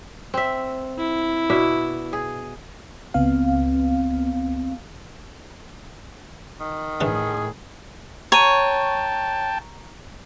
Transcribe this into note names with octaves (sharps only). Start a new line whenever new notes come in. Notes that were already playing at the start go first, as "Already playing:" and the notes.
C4 E5
E4
B2 D4 E5
G#4
C#2 B3 C4 F5
D#3
A2 D3 E3 A3 G#4
C#5 G5 A5 A#5 C#6 D#7